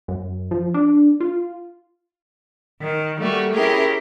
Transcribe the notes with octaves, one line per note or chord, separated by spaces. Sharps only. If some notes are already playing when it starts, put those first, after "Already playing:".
F#2
F3
D4
F4
D#3
G3 A3 A#3 F#4 G4
C#4 E4 G4 G#4 A#4